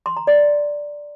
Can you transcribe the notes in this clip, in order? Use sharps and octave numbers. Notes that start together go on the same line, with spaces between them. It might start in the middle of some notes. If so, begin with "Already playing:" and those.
C6
A#5
D5